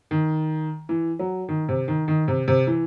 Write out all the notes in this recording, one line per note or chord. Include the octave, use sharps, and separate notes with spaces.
D#3
E3
F#3
D#3
C3
D#3
D#3
C3
C3
E3